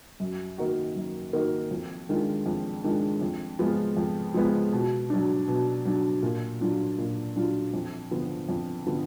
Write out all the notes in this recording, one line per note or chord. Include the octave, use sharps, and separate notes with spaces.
F#2
D#3 A#3 D#4 F#4
F#2
D#3 A#3 D#4 F#4
F2
D#3 G#3 D4 F4
F2
D#3 G#3 D4 F4
F2
F3 G#3 B3 F4
F2
F3 G#3 B3 F4
B2
F#3 D4
B2
F#3 D4
A#2
F#3 D4 F4
A#2
F#3 D4 F4
F2
D3 F3 B3
F2
D3 F3 B3